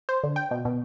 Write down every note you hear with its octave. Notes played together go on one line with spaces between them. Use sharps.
C5
D3
G5
B2
B2